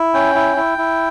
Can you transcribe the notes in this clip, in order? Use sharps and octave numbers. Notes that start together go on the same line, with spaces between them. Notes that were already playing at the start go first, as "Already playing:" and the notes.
Already playing: E4
C#4 G5
E4
E4
E4